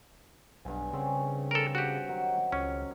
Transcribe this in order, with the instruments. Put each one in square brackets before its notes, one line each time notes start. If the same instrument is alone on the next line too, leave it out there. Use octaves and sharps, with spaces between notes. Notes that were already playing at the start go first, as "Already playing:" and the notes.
[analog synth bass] B1 [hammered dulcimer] G2 G#5
[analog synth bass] C#3 [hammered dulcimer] C4 C#4
[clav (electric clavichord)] A4 A#4
F#4 G4
[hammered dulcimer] D#3 F#3
[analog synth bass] C#2 [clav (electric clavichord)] C#4